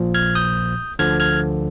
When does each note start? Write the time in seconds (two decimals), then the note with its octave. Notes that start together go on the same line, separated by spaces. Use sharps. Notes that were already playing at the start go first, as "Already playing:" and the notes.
Already playing: A#1 A#2 F3
0.14 F6 G#6
0.35 D#6 G6
0.99 D2 D3 F3 F6 G#6
1.20 F6 G#6